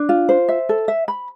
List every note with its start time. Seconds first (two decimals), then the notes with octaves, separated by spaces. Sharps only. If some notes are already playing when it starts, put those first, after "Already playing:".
Already playing: D4
0.09 F4
0.29 C5
0.48 E5
0.69 A4
0.88 E5
1.08 B5